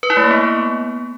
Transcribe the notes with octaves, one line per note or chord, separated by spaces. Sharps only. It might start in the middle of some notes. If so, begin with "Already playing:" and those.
B4
E4
A3
A#3
B3